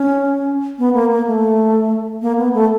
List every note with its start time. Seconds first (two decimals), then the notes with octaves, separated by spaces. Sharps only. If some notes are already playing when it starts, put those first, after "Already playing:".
Already playing: C#4
0.79 B3
0.94 A#3
1.11 A#3
1.27 A3
2.22 A#3
2.37 B3
2.53 A3